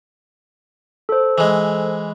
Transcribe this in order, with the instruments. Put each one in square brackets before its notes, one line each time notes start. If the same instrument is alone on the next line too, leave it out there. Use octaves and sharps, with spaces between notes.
[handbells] A4 C5
[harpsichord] E3 G#3